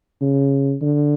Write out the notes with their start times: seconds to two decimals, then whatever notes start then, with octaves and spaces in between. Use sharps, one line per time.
0.22 C#3
0.82 D3